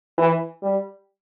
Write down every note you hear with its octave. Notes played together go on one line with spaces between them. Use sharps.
E3
G3